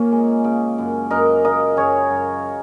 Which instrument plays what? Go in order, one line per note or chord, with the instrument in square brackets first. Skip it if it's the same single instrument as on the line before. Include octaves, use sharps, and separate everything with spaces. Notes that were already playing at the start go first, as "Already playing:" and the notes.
Already playing: [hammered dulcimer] A#2 A#3 C#4
G#3
C#3
F#2
F#2 A#4 D#5
C#3 A#4 D#5
F#2 G#4 C#5
F#2